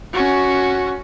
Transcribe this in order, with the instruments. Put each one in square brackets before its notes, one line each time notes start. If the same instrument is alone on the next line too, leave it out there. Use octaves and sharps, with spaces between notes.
[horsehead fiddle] C#4 F#4